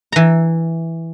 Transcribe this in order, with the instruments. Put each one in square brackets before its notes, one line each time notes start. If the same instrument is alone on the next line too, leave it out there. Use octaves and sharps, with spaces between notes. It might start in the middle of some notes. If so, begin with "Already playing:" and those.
[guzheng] E3 A#5